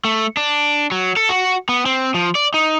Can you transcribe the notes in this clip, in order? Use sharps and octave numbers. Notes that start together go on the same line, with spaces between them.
A3
D4
F#3
A4
F#4
B3
C4
F3
D5
D#4